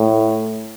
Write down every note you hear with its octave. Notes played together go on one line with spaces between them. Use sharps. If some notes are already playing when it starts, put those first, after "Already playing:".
Already playing: A2